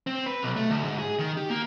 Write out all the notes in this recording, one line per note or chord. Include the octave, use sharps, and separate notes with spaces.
C4
B4
B1
A3
D2
G#2
G#4
D#3
G4
A#3